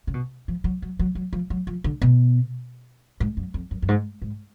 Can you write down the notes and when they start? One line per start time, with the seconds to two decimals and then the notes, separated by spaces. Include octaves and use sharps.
0.07 C#3
0.14 B2
0.48 F3
0.64 F#3
0.82 F#3
0.99 F#3
1.15 F#3
1.33 F3
1.50 F#3
1.67 F3
1.84 D3
2.02 B2
3.20 G#2
3.37 F#2
3.54 F2
3.71 F#2
3.82 F#2
3.88 G#2
4.22 G#2